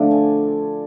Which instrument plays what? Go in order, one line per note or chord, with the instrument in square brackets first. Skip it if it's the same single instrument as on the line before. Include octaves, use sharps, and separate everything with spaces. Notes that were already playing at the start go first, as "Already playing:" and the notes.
Already playing: [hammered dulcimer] D3 F3 A3 D4
G#5